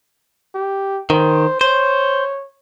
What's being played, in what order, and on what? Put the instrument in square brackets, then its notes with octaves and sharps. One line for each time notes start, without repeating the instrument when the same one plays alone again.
[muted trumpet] G4
[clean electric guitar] D#3 [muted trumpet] C5
[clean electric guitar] C5 [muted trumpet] C#5